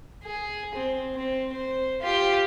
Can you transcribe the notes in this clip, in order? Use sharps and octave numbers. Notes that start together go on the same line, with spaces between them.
G#4
C4
C4
C5
F4 G4